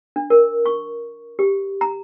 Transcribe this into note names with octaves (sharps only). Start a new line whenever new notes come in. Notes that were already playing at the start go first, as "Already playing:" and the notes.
D4
A#4
C#6
G4
A#5